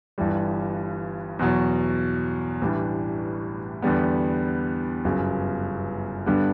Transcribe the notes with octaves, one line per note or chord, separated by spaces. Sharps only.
G1 G2 E3 G3
E2 B2 F#3
A1 A2 E3 G3 D4
E2 D3 G3 B3
G1 F#2 C#3
G2 D3 G3 B3 D4